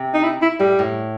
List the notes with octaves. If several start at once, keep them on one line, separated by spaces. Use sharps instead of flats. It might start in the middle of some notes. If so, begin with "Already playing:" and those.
Already playing: C3
D#4
E4
E4
A2 G3
A2